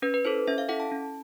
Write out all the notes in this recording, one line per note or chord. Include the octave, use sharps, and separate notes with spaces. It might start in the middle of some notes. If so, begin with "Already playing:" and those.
C#4 B4
B4
E4 A4 C5
C#4 E5
F5
E4 A4 F#5
A5
C#4